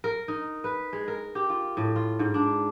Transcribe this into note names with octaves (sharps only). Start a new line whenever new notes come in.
A#4
D#4
B4
G#3
A#4
G4
F4
A2
F4
G#2
D4